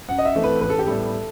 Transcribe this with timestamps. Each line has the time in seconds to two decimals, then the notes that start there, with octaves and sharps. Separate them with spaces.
0.08 F#2 F#5
0.19 D#5
0.25 E5
0.35 E3 A3 C4
0.44 B4
0.61 A1 B4
0.70 A4
0.79 G4
0.87 A2 G3 B3 A4